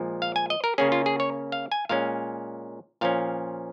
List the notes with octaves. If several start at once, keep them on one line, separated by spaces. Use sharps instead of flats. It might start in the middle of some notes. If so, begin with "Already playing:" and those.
Already playing: A#2 F3 G#3
F5
G#5
D#5
A#4
C#3 A#3 C#4 G#4
F4
G#4
C#5
F5
G#5
A#2 G#3 C#4 F5
A#2 F3 C#4 F5